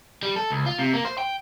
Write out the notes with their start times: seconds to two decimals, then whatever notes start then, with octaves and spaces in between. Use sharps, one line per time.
0.23 G3
0.36 A4
0.50 C#2
0.66 F4
0.78 C3
0.93 A#3
1.05 C5
1.18 G5